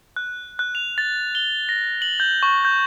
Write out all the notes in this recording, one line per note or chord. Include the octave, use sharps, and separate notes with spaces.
F#6
F#6
F7
A6
G7
A#6
F#7
G6
C#6
G6